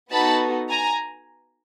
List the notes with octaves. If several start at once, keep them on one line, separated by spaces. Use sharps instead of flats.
B3 D#4 F#4 A4 A5 B5
G#5 A#5